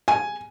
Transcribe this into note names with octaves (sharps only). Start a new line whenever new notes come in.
G#5